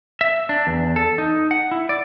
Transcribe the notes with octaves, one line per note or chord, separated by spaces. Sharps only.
E5
D4
E2
A4
D#4
F#5
E4
D5